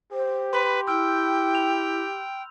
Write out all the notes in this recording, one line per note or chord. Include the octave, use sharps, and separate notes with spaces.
G4 C5
B4 B5 C6
E4 G5 E6 F6 G6
F7